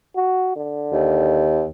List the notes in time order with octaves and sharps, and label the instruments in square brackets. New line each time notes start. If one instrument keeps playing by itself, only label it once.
[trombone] F#4
D3
[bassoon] D#2